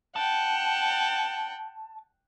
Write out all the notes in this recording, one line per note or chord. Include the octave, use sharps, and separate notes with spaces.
F#5 G5 A5